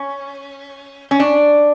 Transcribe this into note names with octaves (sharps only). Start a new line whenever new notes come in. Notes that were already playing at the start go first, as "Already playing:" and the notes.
Already playing: C#4
C#4
D4